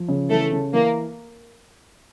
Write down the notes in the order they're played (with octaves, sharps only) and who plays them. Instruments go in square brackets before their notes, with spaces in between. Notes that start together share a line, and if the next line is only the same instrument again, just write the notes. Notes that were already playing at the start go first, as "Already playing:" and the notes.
Already playing: [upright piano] F3
C#3
[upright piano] E3 [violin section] A3 A4
[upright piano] C#3
[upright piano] E3 [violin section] A#3